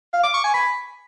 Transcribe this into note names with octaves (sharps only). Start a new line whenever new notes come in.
F5
D6
C#6
G#5
B5